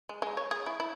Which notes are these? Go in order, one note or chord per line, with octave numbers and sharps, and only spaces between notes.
G#3
G#3
C#5
G#4
E4
E4